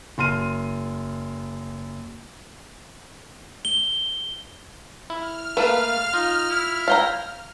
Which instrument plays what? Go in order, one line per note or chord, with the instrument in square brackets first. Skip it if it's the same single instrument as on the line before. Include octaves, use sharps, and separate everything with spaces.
[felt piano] F#1 C6 F6 D#7
[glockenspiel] G7
[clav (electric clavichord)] E4 [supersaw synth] F6
[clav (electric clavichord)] A3 A#3 A4 [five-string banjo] B4 [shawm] F5
[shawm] D#4 [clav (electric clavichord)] F4
[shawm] E4
[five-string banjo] F5 G5 A#5